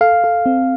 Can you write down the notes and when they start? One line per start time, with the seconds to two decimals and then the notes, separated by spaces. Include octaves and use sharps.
0.01 A4 F5
0.24 A4
0.46 C4